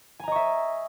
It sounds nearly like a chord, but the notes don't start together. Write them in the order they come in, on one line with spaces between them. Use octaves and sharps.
G#5 A#5 D#5 C#6 E5